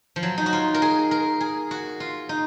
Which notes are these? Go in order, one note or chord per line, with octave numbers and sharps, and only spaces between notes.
F3
F#3
D#4
F#4
F4
A#4
G#4
A#4
G#4
F#4
F4
D#4